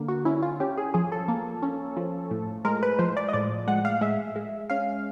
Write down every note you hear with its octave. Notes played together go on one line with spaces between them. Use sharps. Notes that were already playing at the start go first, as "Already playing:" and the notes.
Already playing: D3 A#3
F#4
C#4 E4
F4
C#4 G4
G#4
F3 G#4
A4
A#3
C#4
F3
A2
G#3 A#4
B4
F3 C5
D5
D#5
A2 D5
G#3 F#5
F5
G#3 E5
G#3
C#4 F5